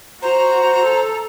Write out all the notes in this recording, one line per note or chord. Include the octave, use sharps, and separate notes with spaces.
F#4 C5 A#5
A4